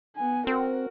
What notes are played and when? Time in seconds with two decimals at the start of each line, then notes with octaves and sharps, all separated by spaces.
0.16 B3 G#5
0.47 C4 F#4 A#4